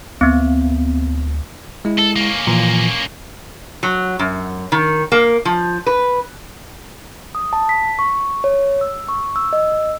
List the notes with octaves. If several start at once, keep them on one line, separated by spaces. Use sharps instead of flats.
D2 B3 C4
G#3 E4
A4
A#3 C#4
A#2 E3 F3
F#3
F#2
D#3
A#3
F3
B4
D#6
A5
B6
C#6
C#5
E6
C#6
E6
D#5
E6